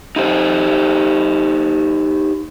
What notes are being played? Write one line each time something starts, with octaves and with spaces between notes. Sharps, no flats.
D#4 G4 C5